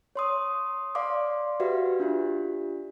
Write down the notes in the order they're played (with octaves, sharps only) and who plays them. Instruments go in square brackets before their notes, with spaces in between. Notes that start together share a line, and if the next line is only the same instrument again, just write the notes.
[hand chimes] C#5 C6 D#6
D5 F5 C6 D6
F#4 G4 B4 E5 F5
D4 F4 G4